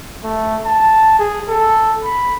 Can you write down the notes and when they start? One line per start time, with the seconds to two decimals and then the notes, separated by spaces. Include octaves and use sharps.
0.23 A3
0.65 A5
1.19 G#4
1.48 A4
2.04 B5